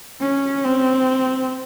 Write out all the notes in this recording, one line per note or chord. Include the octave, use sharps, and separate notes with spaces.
C#4
C4